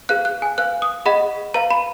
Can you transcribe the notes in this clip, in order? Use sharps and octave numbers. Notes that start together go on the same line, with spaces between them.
G#4 B4 F5 F#6
F#6
G#5
B4 F5 F#6
D#6
G#4 D#5 F#5 B5
B4 F5 A#5
B5